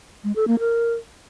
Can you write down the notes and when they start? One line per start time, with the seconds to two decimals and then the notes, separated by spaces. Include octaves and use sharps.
0.24 G#3
0.36 A4
0.47 A#3
0.59 A#4